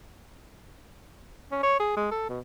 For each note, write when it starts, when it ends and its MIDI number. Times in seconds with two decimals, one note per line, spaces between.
1.52 1.62 61
1.63 1.75 73
1.80 1.96 68
1.97 2.07 56
2.11 2.28 69
2.29 2.39 47